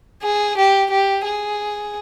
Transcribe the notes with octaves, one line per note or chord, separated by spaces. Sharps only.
G#4
G4
G4
G#4